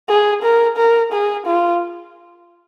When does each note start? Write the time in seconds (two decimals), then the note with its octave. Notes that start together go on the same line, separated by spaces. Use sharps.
0.09 G#4
0.42 A#4
0.77 A#4
1.12 G#4
1.46 F4